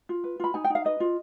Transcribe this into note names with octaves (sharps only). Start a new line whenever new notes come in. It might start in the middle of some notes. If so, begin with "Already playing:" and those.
F4
B4
F4 B5
D#4 G#5
G5
D#4
F5
B4 D#5
F4